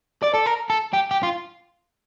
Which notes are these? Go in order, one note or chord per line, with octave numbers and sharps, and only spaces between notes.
D5
A4
A#4
A4
G4
G4
F4